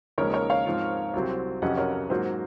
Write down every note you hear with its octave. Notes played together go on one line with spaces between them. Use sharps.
D#2 C#3 F3 G#3 A#4 C#5
A#4 C#5
C#5 F5
G#2 F3 C4 F4
C2 C3 F#3 C4
F2 C3 F#3 C#4 D#5 F#5
A#4 C#5
A#4
G#2 F#3 A#3 F4 C5